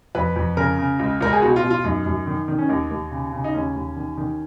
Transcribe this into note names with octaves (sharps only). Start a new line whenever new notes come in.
F2 B4
F2
C#3 A#4
C#3
C#2
C#2 A#4
G#4
B2 F#4
F4
B2
F4
F#2 D#4
F#2
D#3
D#3
C#4
D#2 D#4
D#2
C#3
C#3
D#4
D#2 C#4
D#2
D#3
D#3